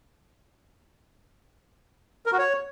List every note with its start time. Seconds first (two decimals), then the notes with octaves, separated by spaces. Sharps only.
2.26 A#4
2.32 F#4
2.39 C#5